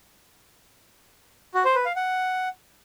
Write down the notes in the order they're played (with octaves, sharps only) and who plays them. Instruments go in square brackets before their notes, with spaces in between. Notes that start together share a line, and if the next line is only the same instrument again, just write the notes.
[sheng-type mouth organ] F#4
C5
B4
F5
F#5